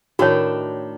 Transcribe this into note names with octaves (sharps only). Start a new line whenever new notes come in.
A2 D#3 D4 F#4 C#5 G5